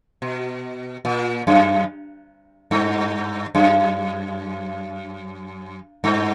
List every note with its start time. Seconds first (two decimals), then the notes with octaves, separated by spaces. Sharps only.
0.22 B2
1.05 A#2
1.47 F#2
2.71 G2
3.55 F#2
6.04 G2